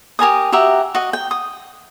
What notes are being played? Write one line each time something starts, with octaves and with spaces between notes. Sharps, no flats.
G4 A#4 G#5 D#6
F#4 G4 E5 A#5
F#4 D#5
G5
D#6